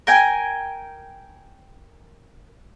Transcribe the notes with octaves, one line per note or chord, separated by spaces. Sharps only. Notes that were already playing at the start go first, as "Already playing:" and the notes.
A#4 G5 G#5